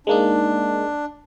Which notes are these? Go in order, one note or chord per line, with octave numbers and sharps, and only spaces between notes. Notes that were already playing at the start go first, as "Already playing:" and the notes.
G#3 A#3 D4 D#4